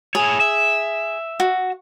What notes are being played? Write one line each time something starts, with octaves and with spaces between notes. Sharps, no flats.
E4 G#4 C#5
E5
F#4